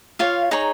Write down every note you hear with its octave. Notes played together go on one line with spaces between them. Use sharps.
F4 C#5 F5
D#4 G#4 C#5 A#5